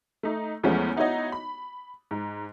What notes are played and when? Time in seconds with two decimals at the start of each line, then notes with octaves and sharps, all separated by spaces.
0.23 A3 D#4
0.63 E2 F3 G#3 A3 B3 C#4
0.97 B3 D#4 E4 F#4 C#5 D#5
1.32 B5
2.11 G#2